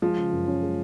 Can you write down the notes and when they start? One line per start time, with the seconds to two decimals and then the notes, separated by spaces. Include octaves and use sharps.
0.02 F3 G#3
0.18 C#3
0.32 F#2
0.48 C#4
0.63 G#3